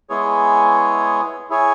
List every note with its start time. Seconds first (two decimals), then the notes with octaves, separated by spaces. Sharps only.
0.09 G#3 B3 E4 G#4 C#5
1.50 E4 G#4 C#5